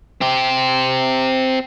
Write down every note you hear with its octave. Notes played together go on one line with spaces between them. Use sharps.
C4 G4